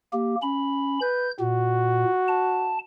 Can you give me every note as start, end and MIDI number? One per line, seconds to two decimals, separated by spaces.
0.13 0.35 58
0.13 0.35 67
0.42 0.99 61
0.42 0.99 83
1.02 1.31 71
1.02 1.31 91
1.40 2.05 46
1.40 2.84 66
2.28 2.78 81